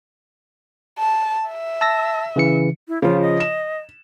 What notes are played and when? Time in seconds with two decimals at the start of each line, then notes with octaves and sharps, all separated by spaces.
0.99 A5
1.48 E5
1.81 A5 E6 A#6
2.36 C#3 E3 C#7
2.88 E4
3.02 C#3 F3 F4
3.22 D#5
3.40 E7